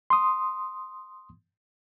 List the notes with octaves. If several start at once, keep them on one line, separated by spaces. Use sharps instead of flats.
C6 D#6